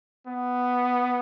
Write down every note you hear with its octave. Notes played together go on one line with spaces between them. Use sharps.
B3